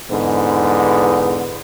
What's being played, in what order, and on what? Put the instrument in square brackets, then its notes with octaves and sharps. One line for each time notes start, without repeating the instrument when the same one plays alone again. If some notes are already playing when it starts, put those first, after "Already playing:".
[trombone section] E2 G#2 D3 B3